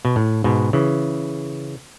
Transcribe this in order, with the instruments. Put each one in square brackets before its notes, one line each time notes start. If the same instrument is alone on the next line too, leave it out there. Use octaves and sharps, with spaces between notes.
[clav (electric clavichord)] B2
A2
G#2 B2
C#3 E3